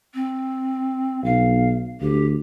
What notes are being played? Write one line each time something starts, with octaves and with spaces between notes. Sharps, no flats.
C4
B1 F5
D2 G4